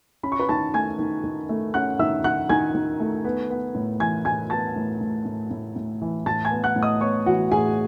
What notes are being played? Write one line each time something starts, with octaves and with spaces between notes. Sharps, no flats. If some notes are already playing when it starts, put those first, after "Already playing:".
C#4 B5
C#6
B4 B5
D#3 A5 A6
A3 G#5 G#6
D#3
D#3
A3
C#4 F#5 F#6
D#3 E5 E6
D#3 F#5 F#6
D#3 G#5 G#6
D#3
A3
B3
B3
A2
E3 G#5 G#6
A2 G#5 G#6
B3 A5 A6
A2
A2
A2
A2
A2
E3
A2 A5 A6
G#5 G#6
B3
F#5 F#6
A2
D#5 D#6
B3 C#5 C#6
E3 F#4 F#5
A2 G#4 G#5